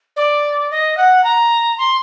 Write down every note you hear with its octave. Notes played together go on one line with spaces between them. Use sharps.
D5
D#5
F#5
A#5
C6